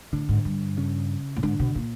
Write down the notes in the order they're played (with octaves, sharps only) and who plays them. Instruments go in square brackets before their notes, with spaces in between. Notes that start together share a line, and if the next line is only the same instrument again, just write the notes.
[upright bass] A2 [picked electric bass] D3 D4
[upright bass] G#2
G2
[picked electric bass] C#3 C#4
[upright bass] A2
[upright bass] G#2 [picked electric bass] D3 D4
[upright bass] B2
A#2